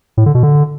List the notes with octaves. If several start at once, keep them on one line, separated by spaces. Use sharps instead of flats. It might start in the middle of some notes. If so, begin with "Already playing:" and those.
A2
D3
B2
D3